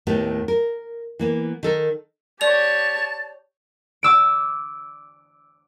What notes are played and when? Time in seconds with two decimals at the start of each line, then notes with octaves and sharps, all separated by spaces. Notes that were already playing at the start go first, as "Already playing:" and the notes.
0.07 D#2 A2 D#3 A3 B3 G4
0.48 A#4
1.19 E3 A#3 B3
1.63 D#3 A4 A#4
2.41 G4 C#5 D5 A5 F7
4.03 D6 E6 D7